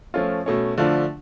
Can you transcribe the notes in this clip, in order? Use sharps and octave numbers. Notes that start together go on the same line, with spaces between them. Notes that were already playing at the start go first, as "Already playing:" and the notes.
F3 A3 C#4 F4
B2 A3 C#4
D3 F3 A3 D4 F4